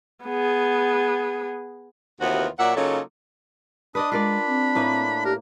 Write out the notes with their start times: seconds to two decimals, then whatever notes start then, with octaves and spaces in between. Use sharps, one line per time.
0.25 B3 G#4
2.21 D#2 C3 E3 B3 F4 F#4
2.59 A#2 F#3 D5 E5 F#5
2.76 C#3 F#3 A#3 D#4 F4 A4
3.95 D4 B4 D5 D#5 D#6
4.12 G#3 F4 A#4 D5 B5
4.47 C4
4.75 A2 A#3 B4
5.25 G4 A#4